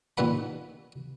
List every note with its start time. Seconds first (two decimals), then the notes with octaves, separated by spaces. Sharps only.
0.17 A#2 D#3 G3 B4 F#5 B5